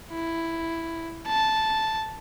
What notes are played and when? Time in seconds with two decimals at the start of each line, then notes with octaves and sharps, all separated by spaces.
0.11 E4
1.27 A5